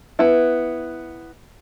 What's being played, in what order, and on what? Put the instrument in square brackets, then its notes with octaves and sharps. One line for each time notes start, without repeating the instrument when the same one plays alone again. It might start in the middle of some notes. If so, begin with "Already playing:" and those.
[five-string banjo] B3 E4